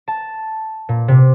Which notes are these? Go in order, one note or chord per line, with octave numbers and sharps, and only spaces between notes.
A5
A#2
C3